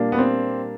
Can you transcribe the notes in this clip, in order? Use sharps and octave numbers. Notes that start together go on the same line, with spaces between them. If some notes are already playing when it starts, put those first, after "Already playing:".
Already playing: A#2 G3 A#3 D4
B3
C4